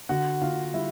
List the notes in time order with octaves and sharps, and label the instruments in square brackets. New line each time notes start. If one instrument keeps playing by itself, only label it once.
[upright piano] D3 F#4 F#5
D3 F4 F5
G3 E4 E5